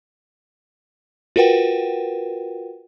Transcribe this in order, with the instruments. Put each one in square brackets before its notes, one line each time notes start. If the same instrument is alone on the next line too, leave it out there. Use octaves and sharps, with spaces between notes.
[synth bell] F4 F#4 A#4 B4 F#5 G5